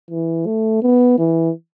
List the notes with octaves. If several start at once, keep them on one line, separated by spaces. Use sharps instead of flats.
E3
A3
B3
E3